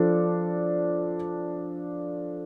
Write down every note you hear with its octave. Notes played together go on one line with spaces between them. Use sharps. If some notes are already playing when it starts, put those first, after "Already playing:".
Already playing: F3 D4 A4